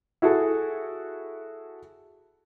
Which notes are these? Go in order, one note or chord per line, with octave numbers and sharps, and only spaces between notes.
E4 F#4 G#4 A4